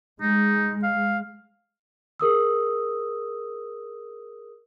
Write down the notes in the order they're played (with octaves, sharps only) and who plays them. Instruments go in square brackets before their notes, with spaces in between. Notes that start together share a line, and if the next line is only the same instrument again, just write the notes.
[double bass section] G#3 [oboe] D#4
[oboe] F5
[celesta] G#4 A#4 D#6 E6